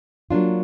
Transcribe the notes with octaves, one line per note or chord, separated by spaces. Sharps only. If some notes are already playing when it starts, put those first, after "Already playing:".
F#3 A#3 D4 F4